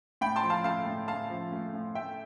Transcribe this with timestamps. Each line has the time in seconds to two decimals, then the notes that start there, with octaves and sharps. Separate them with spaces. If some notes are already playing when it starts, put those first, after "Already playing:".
0.21 A2 G5 B5
0.36 A5 C6
0.43 F3
0.50 F5 A5
0.64 A3 F5 A5
0.86 A2
1.08 A2 F5 A5
1.30 F3
1.52 A3
1.73 A2
1.95 A3 E5 G5